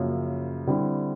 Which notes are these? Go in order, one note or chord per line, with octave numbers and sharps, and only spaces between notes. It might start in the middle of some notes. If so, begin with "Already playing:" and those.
Already playing: F#2 C#3 F3 A#3
D3 G3 C4 E4